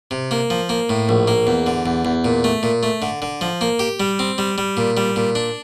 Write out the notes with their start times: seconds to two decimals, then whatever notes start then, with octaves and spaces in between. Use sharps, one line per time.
0.11 C3
0.31 A#3
0.50 F3
0.69 A#3
0.89 A2
1.09 A#1
1.28 A#3
1.47 E2
1.67 D3
1.86 E2
2.05 E2
2.25 A#2
2.44 A3
2.63 A#2
2.83 A3
3.02 D3
3.22 D3
3.41 F3
3.61 A#3
3.79 G4
4.00 G3
4.19 C4
4.38 G3
4.58 G3
4.77 A#2
4.97 G3
5.16 A#2
5.35 D4